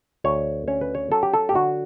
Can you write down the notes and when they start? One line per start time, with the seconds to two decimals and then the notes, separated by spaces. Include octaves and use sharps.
0.24 D2 C#5
0.68 C#4 C#5
0.81 B4
0.95 C#5
1.12 F#3 A4
1.23 G4
1.33 A4
1.49 G4
1.55 D3 F#4